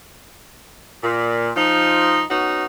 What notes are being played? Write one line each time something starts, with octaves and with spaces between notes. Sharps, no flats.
A#2
F3 D#4
B3 C#4 D#4 F#4